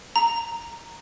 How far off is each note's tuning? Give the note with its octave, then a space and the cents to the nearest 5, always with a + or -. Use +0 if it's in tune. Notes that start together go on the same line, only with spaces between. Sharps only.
A#5 -5